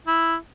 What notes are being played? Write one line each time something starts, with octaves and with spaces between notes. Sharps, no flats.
E4